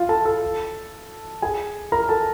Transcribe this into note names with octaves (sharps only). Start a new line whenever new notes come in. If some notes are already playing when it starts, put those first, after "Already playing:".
Already playing: F4 F5
A4 A5
A4 A5
G#4 G#5
A#4 A#5
A4 A5